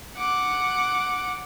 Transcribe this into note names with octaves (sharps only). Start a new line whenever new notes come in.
F#5 D6